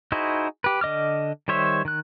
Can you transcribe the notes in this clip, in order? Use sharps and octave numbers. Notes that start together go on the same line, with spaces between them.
D#4 E4 F#4 G#4 C5
G4 B4
D3 D#5 D6 F6
D#3 G3 C5 C#5 E5
D#3 F#6